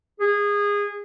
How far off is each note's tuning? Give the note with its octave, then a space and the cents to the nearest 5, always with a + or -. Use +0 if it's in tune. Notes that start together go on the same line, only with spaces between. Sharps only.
G#4 -20